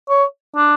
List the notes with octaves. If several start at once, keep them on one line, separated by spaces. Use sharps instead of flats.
C#5
D4